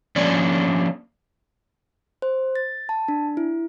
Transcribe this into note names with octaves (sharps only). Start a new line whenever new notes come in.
F3 A#3 C#4 D4 C#5 D5
C5
A6
A5
D4
E4